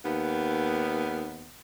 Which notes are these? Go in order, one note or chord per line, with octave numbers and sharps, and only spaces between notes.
D#2 B3